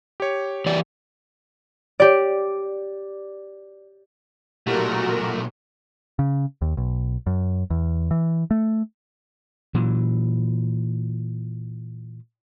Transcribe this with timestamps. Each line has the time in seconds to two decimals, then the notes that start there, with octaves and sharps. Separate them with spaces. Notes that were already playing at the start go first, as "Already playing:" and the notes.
0.20 G4 C#5
0.66 E3 G4 D5
2.00 G4 D5
4.67 B1 A#2 A3 E4 F#4 G4 A#4 F5
6.19 C#3
6.62 D#2
6.77 B1
7.27 F#2
7.70 E2
8.11 E3
8.51 A3
9.74 A#2 E3 F#3